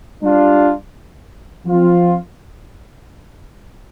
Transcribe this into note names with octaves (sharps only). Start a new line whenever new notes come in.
G3 D4 F4
F3 C4 F4